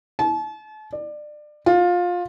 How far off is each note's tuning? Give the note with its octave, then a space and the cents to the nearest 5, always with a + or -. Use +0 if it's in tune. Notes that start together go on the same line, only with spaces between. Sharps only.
A5 -40
D5 +25
F4 +20